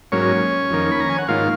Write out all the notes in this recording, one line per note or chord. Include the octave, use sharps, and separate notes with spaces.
G#2 F#3 A#3 C#4 C#5
F2 D#3 A#3
B5
A#5
G#5
F#5
G#2 D#3 A#3 F4 F5